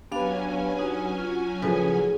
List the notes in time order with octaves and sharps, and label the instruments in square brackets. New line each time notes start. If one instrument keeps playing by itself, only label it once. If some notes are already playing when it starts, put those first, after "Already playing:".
[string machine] F#3 C#4 G#5 [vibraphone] B3 F5 [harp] D4 [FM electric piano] G4 B4
[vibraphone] D#4 F#4
F4
[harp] A2 G#4 [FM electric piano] C#3 F3 [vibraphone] B4